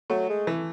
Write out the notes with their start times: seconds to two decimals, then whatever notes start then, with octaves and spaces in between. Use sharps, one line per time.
0.10 F#3 A3
0.29 G#3
0.47 E3